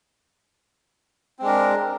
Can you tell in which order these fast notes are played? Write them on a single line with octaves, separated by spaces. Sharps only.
C4 G#3 D4 A#4